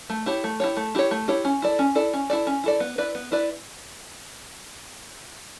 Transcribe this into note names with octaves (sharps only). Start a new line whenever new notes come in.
A3
E4 G4 C#5
A3
E4 G4 C#5
A3
E4 G4 C#5
A3
E4 G4 C#5
C#4
E4 A4 D5
C#4
E4 A4 D5
C#4
E4 A4 D5
C#4
E4 A4 D5
B3
E4 B4 D5
B3
E4 B4 D5